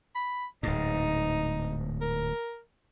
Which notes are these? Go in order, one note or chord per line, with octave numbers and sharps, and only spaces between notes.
B5
D1 G#2 D#4
A#4